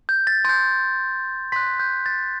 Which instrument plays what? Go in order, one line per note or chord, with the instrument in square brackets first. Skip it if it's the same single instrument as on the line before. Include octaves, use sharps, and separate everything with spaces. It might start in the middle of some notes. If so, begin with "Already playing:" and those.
[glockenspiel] G6
A6
C6 G6 A6
C6 F#6 B6
G6
A6